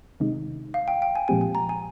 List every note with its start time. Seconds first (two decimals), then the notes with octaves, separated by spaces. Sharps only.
0.20 C3 D#3 G#3 D#4
0.74 F5
0.88 G5
1.02 G5
1.15 G#5
1.28 A#2 F3 G#3 C4 G4 G#5
1.41 G#5
1.55 A#5
1.69 G#5